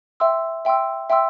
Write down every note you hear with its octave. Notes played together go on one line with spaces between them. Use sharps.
E5 G5 C6 E6
E5 G5 C6 E6
E5 G5 C6 E6